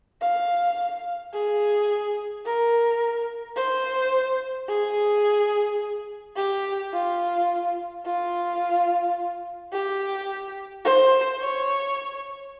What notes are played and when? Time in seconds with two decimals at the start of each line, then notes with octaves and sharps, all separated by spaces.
0.21 F5
1.34 G#4
2.45 A#4
3.56 C5
4.69 G#4
6.36 G4
6.93 F4
8.05 F4
9.73 G4
10.85 C5
11.40 C#5